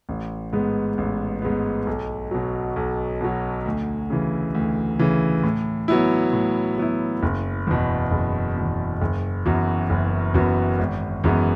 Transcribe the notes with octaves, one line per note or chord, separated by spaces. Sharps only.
A1
G#2 G#3 B3
A1
G#2 G#3 B3
B1
B2 F#3
B1
B2 F#3
D2
C#3 E3
D2
C#3 E3
A2
F#3 B3 E4
A2
F#3 B3 E4
F#1
E2 B2
F#1
E2 B2
F#1
F#2 E3 B3 F#4
F#1
F#2 E3 B3 F#4
G#1
F#2 E3 G#3 B3